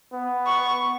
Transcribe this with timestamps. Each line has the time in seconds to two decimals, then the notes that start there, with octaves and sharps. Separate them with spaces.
0.13 B3
0.46 C#6